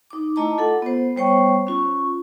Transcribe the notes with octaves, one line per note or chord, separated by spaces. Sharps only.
D#4 D6
A3 E4 D#5 A5 A#5 D6
F4 A4 F#5
B3 C5
G3 B3 C5 C#5 G5 C#6
C#4 F4 C#6